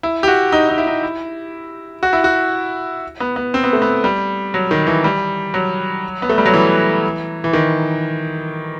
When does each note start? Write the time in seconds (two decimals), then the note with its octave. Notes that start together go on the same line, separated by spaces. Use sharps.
0.03 E4
0.23 G4
0.28 F#4
0.52 D#4
0.69 D#4
0.78 E4
0.87 D#4
1.03 E4
2.03 F#4
2.13 E4
2.24 F#4
3.20 B3
3.36 B3
3.54 C4
3.64 B3
3.73 A3
3.82 B3
4.04 G3
4.54 F#3
4.71 D#3
4.87 E3
5.04 G3
5.54 F#3
6.22 B3
6.29 A3
6.38 G3
6.46 F#3
6.53 E3
7.44 E3
7.53 D#3